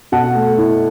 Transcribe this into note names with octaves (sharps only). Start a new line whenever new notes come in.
B2 F#5 A5
A3
E4